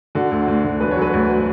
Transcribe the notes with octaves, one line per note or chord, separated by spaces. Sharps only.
D3 F#4
D2
D2
D3
E1 B4
C#5
F#3 B4
D2